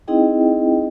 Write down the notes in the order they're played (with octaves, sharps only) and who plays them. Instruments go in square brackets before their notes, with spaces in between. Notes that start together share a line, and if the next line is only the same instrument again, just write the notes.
[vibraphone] C4 D#4 E4 G#4 D#5 G5